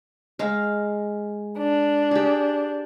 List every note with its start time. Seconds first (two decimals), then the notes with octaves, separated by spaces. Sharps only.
0.39 G#3 F5 A#5
1.58 D4
2.11 G4 G#4